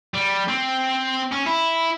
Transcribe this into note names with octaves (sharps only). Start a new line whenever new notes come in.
G3
C4
C#4
E4